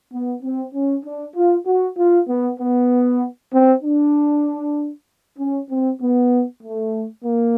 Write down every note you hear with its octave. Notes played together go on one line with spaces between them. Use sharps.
B3
C4
C#4
D4
F4
F#4
F4
B3
B3
C4
D4
C#4
C4
B3
A3
A#3